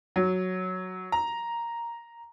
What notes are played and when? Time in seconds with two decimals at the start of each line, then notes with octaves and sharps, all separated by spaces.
0.16 F#3
1.12 A#5